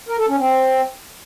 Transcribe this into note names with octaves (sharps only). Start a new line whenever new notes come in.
A#4
A4
C#4
C4